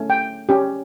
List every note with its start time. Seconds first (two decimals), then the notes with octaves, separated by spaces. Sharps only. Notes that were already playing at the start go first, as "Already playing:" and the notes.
Already playing: A3 C#4
0.10 G5
0.49 C#4 G4